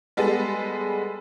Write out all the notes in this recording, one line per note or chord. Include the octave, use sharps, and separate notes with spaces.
G3 G#3 B3 A4